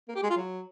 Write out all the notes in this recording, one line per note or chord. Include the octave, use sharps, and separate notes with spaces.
A#3
G4
G#3
F4
F#3